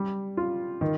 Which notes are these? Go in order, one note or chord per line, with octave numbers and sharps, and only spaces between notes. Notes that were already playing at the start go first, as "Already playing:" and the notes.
Already playing: G3
F4
D#3